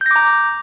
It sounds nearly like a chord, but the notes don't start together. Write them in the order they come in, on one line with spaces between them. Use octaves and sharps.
G6 A#6 D6 A#5